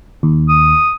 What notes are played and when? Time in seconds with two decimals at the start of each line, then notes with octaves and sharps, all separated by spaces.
0.23 D#2
0.49 D#6